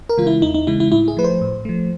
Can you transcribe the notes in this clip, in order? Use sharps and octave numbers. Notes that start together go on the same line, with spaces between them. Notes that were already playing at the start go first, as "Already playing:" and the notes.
A#4
C#3 E3 G#3 F4
E4
E2 D#4
D#4
C#3 E3 G#3 E4
E4
A2 E4
G#4
F3 A3 B4
C5
A2
F3 A3